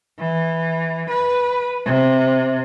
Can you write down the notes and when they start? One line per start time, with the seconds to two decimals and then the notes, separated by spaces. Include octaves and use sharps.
0.19 E3
1.10 B4
1.85 C3